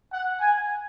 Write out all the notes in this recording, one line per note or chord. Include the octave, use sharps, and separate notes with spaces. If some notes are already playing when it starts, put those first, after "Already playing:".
F#5
G#5